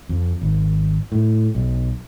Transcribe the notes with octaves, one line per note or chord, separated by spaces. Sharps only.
F2
G#1
A2
B1